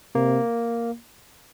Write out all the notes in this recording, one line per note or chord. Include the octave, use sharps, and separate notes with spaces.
C3 A#3